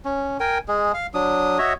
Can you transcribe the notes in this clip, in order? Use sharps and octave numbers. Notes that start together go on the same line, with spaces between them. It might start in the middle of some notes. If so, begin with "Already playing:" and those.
C#4
A#4 G5 G#5
G#3 G#4
F5
F#3 D4 D#6
F#4 C#5 D#5 E5